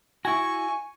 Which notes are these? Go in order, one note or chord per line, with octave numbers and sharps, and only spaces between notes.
E4 F#4 G#5 C#6